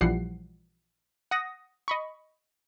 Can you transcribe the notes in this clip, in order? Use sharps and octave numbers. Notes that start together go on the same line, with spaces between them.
A#1 E3 F3 G3 F#5 C7
F#5 D#6 A#6
D#5 B5 C#6